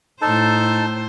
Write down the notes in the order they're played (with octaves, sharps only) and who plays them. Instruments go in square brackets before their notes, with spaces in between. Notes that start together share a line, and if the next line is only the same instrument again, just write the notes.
[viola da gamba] A2 C5 [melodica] D#4 A4 A5